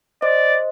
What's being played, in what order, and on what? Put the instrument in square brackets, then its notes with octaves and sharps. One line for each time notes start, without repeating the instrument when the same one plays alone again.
[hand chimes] C5 D#5 [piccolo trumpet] D5